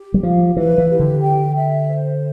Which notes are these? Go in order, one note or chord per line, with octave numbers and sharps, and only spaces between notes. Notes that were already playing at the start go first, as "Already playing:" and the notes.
Already playing: G4
G3
F3 F5
E3 B4
E3
G4
D3
G5
E5
C5